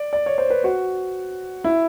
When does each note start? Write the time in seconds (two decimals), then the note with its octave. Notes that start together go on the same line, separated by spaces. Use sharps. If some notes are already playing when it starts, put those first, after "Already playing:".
Already playing: D5
0.13 D5
0.26 C#5
0.38 C5
0.50 B4
0.64 F#4
1.64 E4